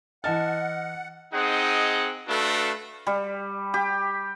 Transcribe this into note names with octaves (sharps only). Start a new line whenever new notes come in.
E3 D#5 F#5 A5 F6 A6
C4 D#4 G#4 D#5 F#5
A3 D4 F#4 A4 B4 F5
G3
G4